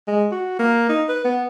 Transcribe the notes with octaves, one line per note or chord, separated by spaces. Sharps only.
G#3
F#4
A#3
D#4
B4
B3